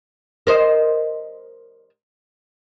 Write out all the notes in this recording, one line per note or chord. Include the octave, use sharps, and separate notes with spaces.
A#4 C5 D#5